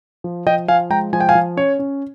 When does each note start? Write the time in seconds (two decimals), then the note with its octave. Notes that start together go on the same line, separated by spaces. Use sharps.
0.24 F3
0.47 F3 D#5 G5
0.68 F3 F5 G#5
0.90 G#3 G5 A#5
1.13 F3 G#5
1.20 G5
1.29 F5 G#5
1.35 F3
1.57 C#4 C#5
1.79 C#4